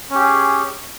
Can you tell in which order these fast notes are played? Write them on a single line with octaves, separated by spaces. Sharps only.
C#4 G4 G#4